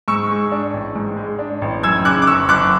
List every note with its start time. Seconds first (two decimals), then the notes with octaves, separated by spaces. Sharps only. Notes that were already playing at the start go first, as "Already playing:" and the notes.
0.08 G#2 C#6 E6
0.30 G#3
0.52 D4
0.74 A1
0.96 G#2
1.17 G#3
1.39 D4
1.62 A1
1.83 F#2 E6 G#6
2.05 C#3 D6 F#6
2.22 D6
2.27 F#1 C#6 E6
2.48 F#1 D6 F#6